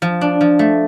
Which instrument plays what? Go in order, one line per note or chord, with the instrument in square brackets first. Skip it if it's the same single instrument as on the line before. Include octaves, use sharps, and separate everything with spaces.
[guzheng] F3
D4
F3
A3